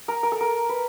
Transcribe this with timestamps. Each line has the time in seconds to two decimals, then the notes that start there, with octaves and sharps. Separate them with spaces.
0.08 A#4
0.23 A#4
0.32 A4
0.41 A#4
0.69 B4